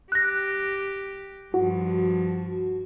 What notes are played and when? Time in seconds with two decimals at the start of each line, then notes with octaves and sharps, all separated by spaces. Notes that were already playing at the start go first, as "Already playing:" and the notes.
0.12 G4 F#6 A#6
1.54 G2 F3 F#4